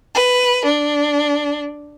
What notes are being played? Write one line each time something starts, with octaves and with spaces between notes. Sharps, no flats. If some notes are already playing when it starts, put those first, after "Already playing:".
B4
D4